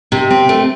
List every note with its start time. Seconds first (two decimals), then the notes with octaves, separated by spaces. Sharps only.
0.12 C3
0.31 C4
0.49 A3